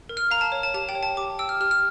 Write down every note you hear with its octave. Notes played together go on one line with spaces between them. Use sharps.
A#4
F6
F5 A#5
A5
C#5
A5
G4 A5
G5
C#5
A5
G4 D6
G5 E6
F6
G4 F6
F6